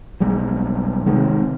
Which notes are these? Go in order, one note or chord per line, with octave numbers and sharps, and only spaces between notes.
B1 G3 G#3
C3 D#3 G#3